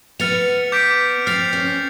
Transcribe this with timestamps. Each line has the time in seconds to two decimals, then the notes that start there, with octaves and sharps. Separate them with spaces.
0.19 B3 F6 A6 C#7 F7
0.72 D6 G6 B6 D7
1.26 C4 F6 A6 C7 F7
1.53 C#4